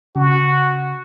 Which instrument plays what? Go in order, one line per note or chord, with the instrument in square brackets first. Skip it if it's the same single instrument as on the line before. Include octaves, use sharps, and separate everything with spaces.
[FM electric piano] C#3 [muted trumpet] F#4